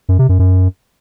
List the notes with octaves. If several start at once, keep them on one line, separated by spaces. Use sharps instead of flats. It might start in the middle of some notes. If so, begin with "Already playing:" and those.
F#2
C3
F#2
F#2